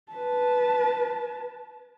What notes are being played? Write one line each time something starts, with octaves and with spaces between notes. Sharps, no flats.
B4 A5